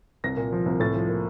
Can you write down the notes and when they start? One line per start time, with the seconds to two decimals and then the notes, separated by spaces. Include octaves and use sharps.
0.24 C2 A#6
0.37 A#2
0.52 F3
0.66 C2
0.80 A2 A6
0.95 F3
1.08 A#3